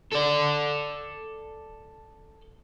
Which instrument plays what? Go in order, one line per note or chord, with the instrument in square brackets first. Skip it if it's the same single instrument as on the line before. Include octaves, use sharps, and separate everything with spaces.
[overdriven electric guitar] A4 D5